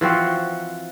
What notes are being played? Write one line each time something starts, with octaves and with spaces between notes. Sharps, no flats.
E3 F3 C4 F#4